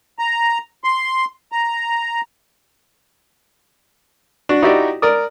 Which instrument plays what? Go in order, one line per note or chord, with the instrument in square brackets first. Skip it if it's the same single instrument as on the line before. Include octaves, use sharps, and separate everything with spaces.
[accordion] A#5
C6
A#5
[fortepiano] D4 F#4
D#4 E4 F#4 G4 D5 E5
A#4 D5 D#6